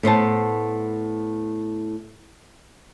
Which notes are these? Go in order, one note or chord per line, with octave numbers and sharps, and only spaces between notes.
A2 B3 C5 A5